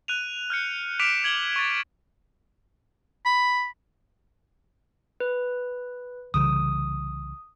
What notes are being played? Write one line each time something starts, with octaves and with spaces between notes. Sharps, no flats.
F#6 D#7 F7
F6 G6 C#7
D6 F6 B6 D7 E7 F7
G#6 F#7 G7
C#6 A6
B5
B4
C2 C#3 E3 D#6